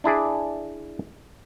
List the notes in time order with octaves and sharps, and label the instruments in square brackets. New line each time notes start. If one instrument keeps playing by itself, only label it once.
[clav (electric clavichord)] D4 E4 G#4 D5